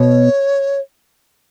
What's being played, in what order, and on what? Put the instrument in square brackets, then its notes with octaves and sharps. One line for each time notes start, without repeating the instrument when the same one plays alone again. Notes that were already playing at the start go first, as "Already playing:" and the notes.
Already playing: [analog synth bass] B2 [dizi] C#5